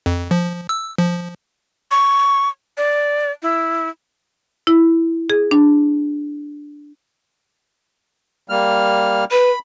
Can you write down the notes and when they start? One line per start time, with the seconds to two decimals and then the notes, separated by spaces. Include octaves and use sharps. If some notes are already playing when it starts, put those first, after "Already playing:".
0.06 F2
0.31 F3
0.69 E6
0.98 F3
1.91 C#6
2.77 D5
3.42 E4
4.67 E4
5.30 G#4
5.51 D4
8.50 G3 A#3 F6
9.31 B4 B5